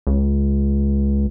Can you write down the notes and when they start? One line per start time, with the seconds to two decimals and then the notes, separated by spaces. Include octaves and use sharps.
0.07 C#2